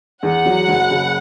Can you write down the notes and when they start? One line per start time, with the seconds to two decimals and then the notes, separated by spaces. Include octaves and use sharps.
0.23 E2 F#5
0.45 F#3
0.68 F#1
0.90 C#3